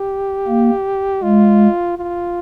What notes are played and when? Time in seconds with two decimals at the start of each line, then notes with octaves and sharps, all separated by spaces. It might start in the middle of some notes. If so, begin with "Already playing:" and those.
Already playing: G4
0.47 A#3
1.22 G#3 F4
1.97 F4